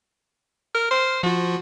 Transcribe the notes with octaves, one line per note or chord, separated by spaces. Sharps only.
A#4 F6
C5
F3 F4 F#4